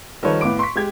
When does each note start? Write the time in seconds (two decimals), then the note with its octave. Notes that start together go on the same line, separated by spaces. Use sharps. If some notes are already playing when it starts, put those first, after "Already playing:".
0.23 D#3 F3 G3 A4 B4 C#5
0.41 A2 B3 F5 D6 D7
0.59 C6 C#6 B6
0.76 G#3 G4 G#6